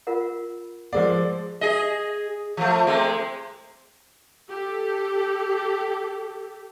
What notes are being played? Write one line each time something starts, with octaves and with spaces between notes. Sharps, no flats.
F4 A#4 F#5
F3 G#3 G#4 A#4 D5 F#5
G#4 D#5
F3 A3
G#3 A3 C4
G4 A4